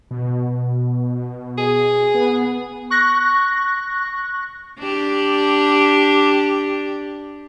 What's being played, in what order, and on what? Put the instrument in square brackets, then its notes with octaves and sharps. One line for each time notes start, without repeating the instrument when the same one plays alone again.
[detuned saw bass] B2
[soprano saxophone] G#4
[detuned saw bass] B3
[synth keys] C#6 F#6 A#6
[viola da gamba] D4 G4